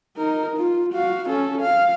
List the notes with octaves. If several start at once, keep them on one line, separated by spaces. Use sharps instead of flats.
D#4 A#4
F4
F#4 F5
C#4 A4
F5